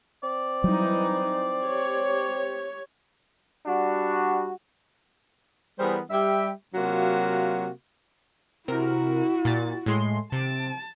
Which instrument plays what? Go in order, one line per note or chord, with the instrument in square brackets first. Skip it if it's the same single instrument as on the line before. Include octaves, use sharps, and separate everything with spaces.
[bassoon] C4 [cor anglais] D5
[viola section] E3 D#4 [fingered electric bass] F#3 G3
[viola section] G4 C#5
[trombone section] G3 D4 F#4
[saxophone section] E3 G3 B3 G#4 A#4 C5
G3 G4 E5
C3 F#3 A#3 F4 F#4
[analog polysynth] C3 A#4 [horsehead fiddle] E4 F#4
[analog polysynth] A#2 A6
A2 G#3 C6
[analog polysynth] C3 D7 [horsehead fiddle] A5